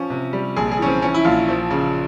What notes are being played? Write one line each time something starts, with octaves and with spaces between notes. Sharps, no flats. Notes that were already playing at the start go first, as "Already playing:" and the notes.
Already playing: F3 C#4
C3
G3
A#1 G#4
G#4
E3 C#4
C4
E3 C#4
E4
A#1 F4
F3
C#3